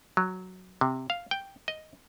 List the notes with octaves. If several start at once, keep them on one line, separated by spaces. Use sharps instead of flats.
F#3
C3
F5
G5
D#5